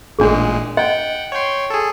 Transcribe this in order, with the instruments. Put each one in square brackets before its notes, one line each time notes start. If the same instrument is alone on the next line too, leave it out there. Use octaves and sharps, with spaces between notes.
[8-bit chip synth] A1 A#2 G#3 [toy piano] D4 G#4
[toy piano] D#5 [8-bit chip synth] F#5 G5
[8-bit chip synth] C#5 G5 C6
G#4 A4